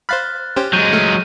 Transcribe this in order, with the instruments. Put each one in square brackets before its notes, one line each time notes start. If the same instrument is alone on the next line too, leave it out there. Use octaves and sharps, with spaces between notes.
[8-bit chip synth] C5 F5 B5 [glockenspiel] F6 F#6 A6
[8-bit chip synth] C#4 G4 C5
[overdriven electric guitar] F#3 G#3 [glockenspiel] G6 D#7
[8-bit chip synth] A3 [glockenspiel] F6